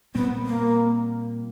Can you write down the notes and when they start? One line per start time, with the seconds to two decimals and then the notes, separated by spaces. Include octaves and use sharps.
0.15 A#2 G3 B3 C4
0.46 A#3